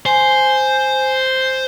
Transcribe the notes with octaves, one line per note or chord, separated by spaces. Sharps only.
C5 G#5